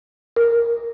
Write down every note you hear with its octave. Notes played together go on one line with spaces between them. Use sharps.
A#4